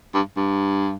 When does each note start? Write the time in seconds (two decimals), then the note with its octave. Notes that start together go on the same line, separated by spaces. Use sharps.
0.14 G2
0.37 G2